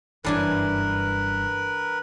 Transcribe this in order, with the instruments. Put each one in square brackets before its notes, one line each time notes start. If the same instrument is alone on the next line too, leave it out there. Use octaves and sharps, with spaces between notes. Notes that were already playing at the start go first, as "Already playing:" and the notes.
[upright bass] F#1 G2 [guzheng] E3 D4 G#5 [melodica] A#4 B4